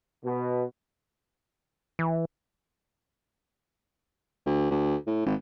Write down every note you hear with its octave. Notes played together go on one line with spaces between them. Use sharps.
B2
E3
D2
D2
A2
G#1